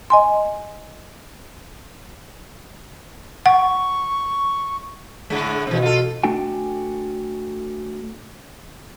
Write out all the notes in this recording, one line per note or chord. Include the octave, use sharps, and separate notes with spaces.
D#5 G#5 C6
F#5 C#6
A2 D3 G#3
B2 E3 C4
F4 A4
A3 D4 F#4 A4 G5 G#5